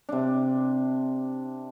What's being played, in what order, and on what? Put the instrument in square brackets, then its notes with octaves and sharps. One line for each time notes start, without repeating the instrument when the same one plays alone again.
[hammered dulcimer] C3 D4